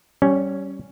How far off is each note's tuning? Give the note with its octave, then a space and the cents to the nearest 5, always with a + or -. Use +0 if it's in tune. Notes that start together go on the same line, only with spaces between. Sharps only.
G3 -20 C#4 +0